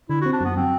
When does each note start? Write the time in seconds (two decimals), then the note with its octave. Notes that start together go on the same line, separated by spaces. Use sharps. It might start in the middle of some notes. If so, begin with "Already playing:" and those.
0.09 D3 E4
0.21 C4 F#4
0.33 D4
0.40 F#2 B3
0.57 F#3 C4